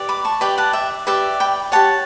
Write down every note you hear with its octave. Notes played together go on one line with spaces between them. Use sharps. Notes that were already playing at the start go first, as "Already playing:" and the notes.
Already playing: G4 B4 D5
B5 D6
A5 C#6
G4 B4 D5 G5 B5
F#5 A5
E5 G5
G4 B4 D5 E5 G5
G5 B5
G4 C#5 F#5 A5